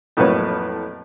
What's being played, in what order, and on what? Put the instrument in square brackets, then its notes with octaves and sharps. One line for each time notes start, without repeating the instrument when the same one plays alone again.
[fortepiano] F2 A2 F#3 A#3 B4 C#5